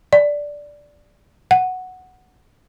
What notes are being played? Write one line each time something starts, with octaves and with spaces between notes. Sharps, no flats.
D5
F#5